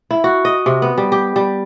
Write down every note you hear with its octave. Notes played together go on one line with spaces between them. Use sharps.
E4
F#4
D#5
C3
B3
G3
G4
G3